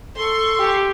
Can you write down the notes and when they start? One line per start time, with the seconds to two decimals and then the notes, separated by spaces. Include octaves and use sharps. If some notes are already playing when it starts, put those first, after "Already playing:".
0.16 A4 C6 C#6
0.59 G4